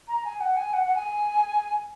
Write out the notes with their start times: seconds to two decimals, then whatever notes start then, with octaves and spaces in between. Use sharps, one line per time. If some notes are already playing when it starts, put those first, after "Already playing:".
0.08 A#5
0.24 G#5
0.40 F#5
0.57 G#5
0.73 F#5
0.85 F#5
0.95 G#5